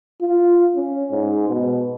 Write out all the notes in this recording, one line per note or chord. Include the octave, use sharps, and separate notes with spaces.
F4
C#4
G#2
B2